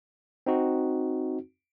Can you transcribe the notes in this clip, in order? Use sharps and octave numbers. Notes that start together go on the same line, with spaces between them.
C4 D#4 F#4